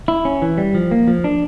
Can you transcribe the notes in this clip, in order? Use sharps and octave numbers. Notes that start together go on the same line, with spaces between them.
E4
C#4
E3
G3
F3
A#3
F3
D4